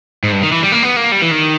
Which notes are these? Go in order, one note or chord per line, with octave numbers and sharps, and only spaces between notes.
G#2
G2
D#3
E3
G3
A#3
B3
A#3
G3
E3
D#3